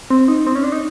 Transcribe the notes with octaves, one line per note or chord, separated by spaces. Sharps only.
C4
D#4
C4
C#4
D4
D#4